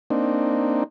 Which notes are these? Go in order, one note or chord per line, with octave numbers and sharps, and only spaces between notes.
A#3 C4 D4 D#4